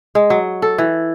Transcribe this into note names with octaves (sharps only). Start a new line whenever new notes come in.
G#3
F#3
A4
E3